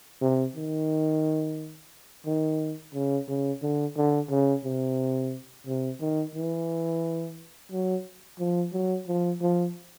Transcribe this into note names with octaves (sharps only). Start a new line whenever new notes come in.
C3
D#3
D#3
C#3
C#3
D3
D3
C#3
C3
C3
D#3
E3
F#3
F3
F#3
F3
F3